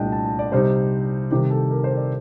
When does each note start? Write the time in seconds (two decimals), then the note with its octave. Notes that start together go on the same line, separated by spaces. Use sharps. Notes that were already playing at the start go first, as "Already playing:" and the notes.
Already playing: C2 A#2 A3 D4 D#5 G5
0.12 A5
0.25 A5
0.39 D5
0.52 C3 G3 C4 D#4 C5
1.31 C3 D#3 G3 G4
1.51 A4
1.70 A#4
1.84 C5
1.97 D5